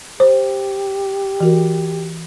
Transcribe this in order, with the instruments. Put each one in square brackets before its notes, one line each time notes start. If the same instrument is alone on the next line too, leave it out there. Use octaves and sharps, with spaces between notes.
[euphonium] G4 [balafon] C5
[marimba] E3 F#4 A#4